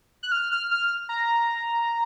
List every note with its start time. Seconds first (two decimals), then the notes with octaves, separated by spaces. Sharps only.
0.23 F#6
0.32 F6
0.52 F6
0.71 F6
1.09 A#5